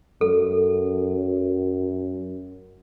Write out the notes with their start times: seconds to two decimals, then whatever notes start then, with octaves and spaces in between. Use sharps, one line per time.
0.21 F#2 A4